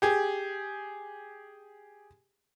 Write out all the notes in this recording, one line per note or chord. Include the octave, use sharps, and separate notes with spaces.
G4 G#4